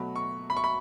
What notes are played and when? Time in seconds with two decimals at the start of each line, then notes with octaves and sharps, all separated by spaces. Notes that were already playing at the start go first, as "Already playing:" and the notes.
Already playing: B2 F#3 A3 B5
0.16 C#6
0.50 B5
0.57 C#6
0.64 B5